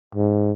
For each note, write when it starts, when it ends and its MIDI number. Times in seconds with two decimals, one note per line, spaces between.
0.15 0.52 44